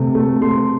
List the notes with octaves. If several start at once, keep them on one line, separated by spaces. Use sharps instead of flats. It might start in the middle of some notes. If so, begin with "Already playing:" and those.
Already playing: C3 A3
A3
A3 C6